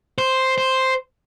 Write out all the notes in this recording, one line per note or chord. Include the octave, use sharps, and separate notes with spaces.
C5
C5